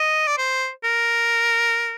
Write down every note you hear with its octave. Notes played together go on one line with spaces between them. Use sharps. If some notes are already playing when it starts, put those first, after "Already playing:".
Already playing: D#5
D5
C5
A#4